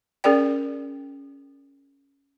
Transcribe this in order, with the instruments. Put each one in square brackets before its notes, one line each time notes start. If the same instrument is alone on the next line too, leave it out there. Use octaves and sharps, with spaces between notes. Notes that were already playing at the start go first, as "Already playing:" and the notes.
[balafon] C#4 G#4 A#4 D5 G5